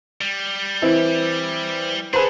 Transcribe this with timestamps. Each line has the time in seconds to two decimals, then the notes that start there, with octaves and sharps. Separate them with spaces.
0.21 G3
0.82 E3 C4 E4
2.13 D4 G#4 A4 B4 C5